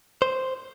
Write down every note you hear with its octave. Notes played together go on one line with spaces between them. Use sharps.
C5